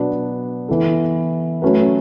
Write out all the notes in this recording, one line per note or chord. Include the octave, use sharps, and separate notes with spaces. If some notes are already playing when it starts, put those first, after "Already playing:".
Already playing: B2 F#3 B3 D4
E3 B3 E4 A4
F#3 A3 C#4 F#4 B4